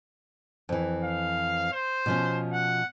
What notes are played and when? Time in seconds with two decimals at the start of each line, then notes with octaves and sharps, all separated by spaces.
0.69 F2 E3
1.04 F5
1.73 C5
2.06 B2 F3 C#4
2.53 F#5